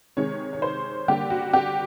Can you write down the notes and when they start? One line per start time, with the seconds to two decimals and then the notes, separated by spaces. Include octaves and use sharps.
0.17 C3 D#3 G#3 C#5
0.53 C#5
0.62 C5
1.08 D3 G3 A#3 G4
1.30 F#4
1.53 G4